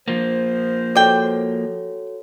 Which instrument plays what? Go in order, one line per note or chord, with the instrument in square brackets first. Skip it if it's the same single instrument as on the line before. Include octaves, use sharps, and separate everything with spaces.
[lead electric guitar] F3 A#3 [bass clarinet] C5
[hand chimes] F#4 A4 C#5 [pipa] D5 G5